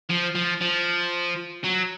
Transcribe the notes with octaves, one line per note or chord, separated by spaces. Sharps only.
F3
F3
F3
F#3